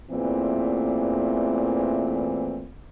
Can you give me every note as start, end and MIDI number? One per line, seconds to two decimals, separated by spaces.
0.11 2.67 40
0.11 2.67 46
0.11 2.67 52
0.11 2.67 57
0.11 2.67 60